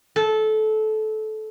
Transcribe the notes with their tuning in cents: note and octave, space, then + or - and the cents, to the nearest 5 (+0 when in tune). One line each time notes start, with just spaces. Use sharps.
A4 -20